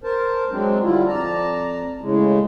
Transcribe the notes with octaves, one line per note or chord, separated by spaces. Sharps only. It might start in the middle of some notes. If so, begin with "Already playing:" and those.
A#4 C5 A5
F#3 G#3 C4 D4
D3 G3 E4 F4
F2 D5 A5 A#5
A2 C#3 G#3